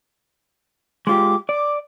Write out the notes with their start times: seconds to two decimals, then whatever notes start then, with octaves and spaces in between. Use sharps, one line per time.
1.07 G#3 F4 G4 D6
1.49 D5 D6